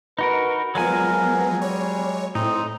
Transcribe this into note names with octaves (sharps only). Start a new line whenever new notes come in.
D#4 F#4 A#4 B4
F3 F#3 G#3 B3 A#4 G#5
G3 C#5
A2 C4 D#4